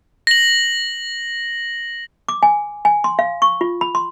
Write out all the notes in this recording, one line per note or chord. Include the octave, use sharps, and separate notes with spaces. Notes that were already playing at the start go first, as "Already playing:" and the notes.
A#6 F#7
D6
G#5
G#5
C6
F5
C#6
F4
B5
C6